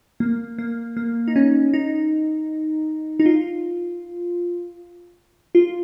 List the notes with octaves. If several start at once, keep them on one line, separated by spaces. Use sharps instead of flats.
A#3
A#3
A#3
D#4
C#4
D#4
D#4
F4
F4